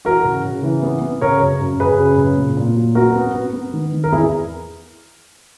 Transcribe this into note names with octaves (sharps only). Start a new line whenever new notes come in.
E3 F#4 A#4
C#3
C#3
E3
B3
B3
C#3 A#4 C#5
F#2
F#2
C#3 G#4 B4
F#2
C#3
A#2
A#2
F#3
B3 F#4 A#4
B3
B3
B3
D#3
D#3
A#4
E2 E4 G#4